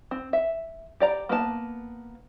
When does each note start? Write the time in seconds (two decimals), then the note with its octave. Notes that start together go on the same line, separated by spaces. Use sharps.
0.11 C4
0.33 E5
1.00 G4 D5 A#5
1.29 A#3 B3 B4 A5